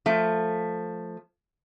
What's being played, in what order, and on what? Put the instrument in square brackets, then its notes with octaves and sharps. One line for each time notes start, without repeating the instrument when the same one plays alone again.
[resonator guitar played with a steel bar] F3 A3